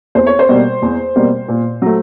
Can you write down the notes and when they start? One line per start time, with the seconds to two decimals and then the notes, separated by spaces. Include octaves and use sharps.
0.15 E2 C5
0.27 C#5
0.39 C5
0.49 B2 G3 A#3
0.82 E2
1.16 B2 G3 A#3
1.48 A#2
1.82 F#3 A3